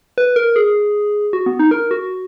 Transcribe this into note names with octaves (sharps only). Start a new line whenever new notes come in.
B4
A#4
G#4
F#4
B3
D#4
A#4
F#4